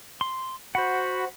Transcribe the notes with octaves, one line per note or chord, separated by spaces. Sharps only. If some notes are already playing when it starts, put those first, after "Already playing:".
C6
F#4 C5 F#5 B5